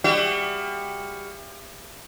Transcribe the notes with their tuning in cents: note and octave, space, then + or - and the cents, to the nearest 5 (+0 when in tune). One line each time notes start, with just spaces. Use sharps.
G3 +35 F#4 +35 E5 +40